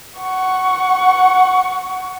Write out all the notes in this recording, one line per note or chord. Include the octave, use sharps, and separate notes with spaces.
F#5 C#6